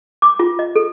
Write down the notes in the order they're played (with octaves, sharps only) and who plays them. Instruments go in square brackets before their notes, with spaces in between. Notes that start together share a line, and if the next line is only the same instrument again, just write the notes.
[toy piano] D6
F4
D#5
A4